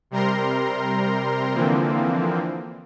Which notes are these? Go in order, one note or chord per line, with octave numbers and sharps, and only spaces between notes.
C3 G3 A#4 A#5 C6
D3 E3 F3 A#3 C4